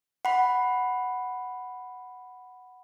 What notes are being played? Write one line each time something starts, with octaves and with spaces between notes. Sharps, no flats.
F#5 B5